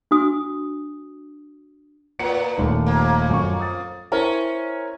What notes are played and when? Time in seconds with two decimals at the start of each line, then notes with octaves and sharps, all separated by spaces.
0.11 D4 F#4 D#6
2.19 A2 B4 C#7
2.58 D#1 D#2 A3
2.86 F2 A#3
3.29 F#2 C#6
3.60 D#6 A6
4.12 C#4 E4 A#4 C5